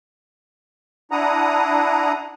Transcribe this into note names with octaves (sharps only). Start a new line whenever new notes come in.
D4 E4 F#5 A#5 D#6